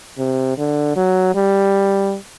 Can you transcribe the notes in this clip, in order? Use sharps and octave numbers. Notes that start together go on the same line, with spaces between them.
C3
D3
F#3
G3